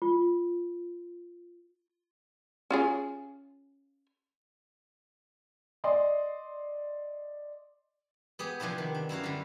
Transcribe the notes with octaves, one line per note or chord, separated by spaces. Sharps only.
F4
C#4 F4 G#4
D5 D#5 C6
B3 G4 G#4
C3 F3 B3 D4 E4
D#3
D4
F#2 E4 F#4 F5
D3 G3